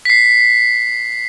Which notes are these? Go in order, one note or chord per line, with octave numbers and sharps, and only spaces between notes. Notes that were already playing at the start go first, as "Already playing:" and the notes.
B6 C7